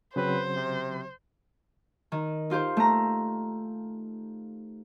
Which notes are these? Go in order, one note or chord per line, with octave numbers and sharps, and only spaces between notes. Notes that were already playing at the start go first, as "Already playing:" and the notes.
C#3 F#3 C4 B4 C5
C3
D#3
D#4 F4 G4 C5
A3 A#5